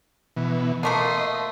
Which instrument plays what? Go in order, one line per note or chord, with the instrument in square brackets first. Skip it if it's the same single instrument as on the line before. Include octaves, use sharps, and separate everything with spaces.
[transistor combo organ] B2 E3
[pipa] F3 A3 A#3 [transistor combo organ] D#5 C6